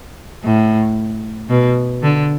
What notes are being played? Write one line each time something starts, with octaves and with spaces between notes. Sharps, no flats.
A2
B2
D3